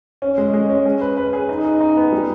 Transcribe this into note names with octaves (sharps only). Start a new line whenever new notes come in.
C#4
G#3
G#3
C#4
G#4
B4
B4
G#4
D#4
D#4
D#4
B3
G3